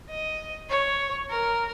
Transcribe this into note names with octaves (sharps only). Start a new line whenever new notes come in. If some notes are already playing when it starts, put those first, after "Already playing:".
D#5
C#5
A#4